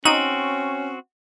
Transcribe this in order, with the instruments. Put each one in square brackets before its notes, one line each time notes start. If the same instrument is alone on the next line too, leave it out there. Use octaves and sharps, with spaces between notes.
[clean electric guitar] C4 F#4 [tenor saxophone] C#4 [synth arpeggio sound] D#4 D#7